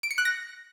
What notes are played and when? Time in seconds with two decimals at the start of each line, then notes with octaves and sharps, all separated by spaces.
0.03 D7
0.11 C#7
0.18 F#6
0.25 A#6